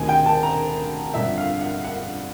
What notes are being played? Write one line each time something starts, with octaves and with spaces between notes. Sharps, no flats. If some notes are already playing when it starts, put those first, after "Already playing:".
Already playing: D2 C3 D#3 G#5
G5
A5
A#5
G1 F2 D3 F3 E5
F5
F#5
F#5